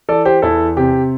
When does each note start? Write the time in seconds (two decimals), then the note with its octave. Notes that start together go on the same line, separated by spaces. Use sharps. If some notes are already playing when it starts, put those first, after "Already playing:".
0.09 E3 A4 D5
0.25 G4 C5
0.42 E2 E4 A4
0.77 C3 G4